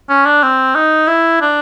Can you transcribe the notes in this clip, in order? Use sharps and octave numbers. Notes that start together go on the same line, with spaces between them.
C#4
D4
C4
D#4
E4
D4